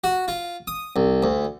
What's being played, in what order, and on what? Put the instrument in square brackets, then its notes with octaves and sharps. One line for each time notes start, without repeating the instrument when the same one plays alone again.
[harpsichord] F#4
F4
D#6
C2
D2